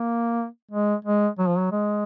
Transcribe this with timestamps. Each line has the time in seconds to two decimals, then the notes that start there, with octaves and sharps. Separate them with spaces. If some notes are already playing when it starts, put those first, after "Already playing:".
Already playing: A#3
0.72 G#3
1.05 G#3
1.39 F#3
1.48 F3
1.58 F#3
1.72 G#3